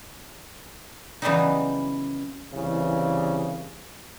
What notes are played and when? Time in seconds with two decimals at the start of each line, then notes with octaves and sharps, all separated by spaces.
1.22 C#3 E3 F#3 G3 B3 D#4
2.53 C2 C#3 E3